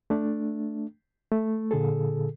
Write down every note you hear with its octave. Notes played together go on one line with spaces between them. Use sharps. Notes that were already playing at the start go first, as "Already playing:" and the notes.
A3 D4
A3
A#2 D3 G#4 A4